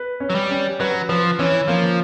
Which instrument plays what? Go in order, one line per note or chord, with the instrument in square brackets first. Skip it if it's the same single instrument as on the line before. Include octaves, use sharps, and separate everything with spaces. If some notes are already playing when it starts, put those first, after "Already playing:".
Already playing: [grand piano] B4
C#4
[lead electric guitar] F#3
G3
[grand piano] C#4
[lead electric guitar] F#3 [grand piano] B4
[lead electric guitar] F3 [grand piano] B4
[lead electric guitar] E3 [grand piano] C#4
[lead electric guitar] F3 [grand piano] A#3